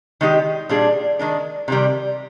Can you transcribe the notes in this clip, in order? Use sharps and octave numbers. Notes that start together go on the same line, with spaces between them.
D#3 G#3 D#4 G4
A#2 G3 D4 G#4
D#3 G#3 D4
C3 D#3 G3